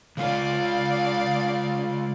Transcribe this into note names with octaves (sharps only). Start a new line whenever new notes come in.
C#3 G#3 F4 D5 F5